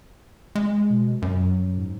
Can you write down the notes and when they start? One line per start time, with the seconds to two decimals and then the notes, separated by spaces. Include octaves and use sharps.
0.55 G#3
0.90 B2
1.22 F#2 F#3
1.77 G#2